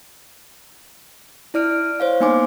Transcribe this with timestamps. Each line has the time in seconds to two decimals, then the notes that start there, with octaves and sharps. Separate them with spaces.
1.54 E4 D5 F6 D7
2.00 C5 C#5 F5
2.20 A#3 B3 D#4 G#5 C6 D6